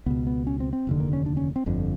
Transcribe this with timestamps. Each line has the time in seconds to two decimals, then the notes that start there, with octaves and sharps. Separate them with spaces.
0.06 C#2 B2 B3
0.27 B3
0.47 C#4
0.60 C4
0.73 C4
0.87 F1 D#2 D3
1.00 A#3
1.13 C#4
1.26 D4
1.37 C#4
1.56 C4
1.66 G1 F2 D3